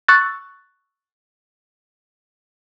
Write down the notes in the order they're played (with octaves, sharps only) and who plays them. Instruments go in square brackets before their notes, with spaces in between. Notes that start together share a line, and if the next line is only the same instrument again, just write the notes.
[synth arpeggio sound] C#6 E6 F#6 A6